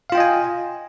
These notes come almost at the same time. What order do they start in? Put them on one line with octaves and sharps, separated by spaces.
F5 F4 G5 D#5 G#5